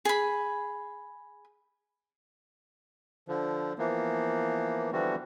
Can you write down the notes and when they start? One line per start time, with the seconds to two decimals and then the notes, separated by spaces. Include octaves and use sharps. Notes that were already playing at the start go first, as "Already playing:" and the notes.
0.05 G#4 B5
3.28 D3 F3
3.79 E3 F3 A#3 B3
4.92 D3 E3 F3 G3 B3 F#4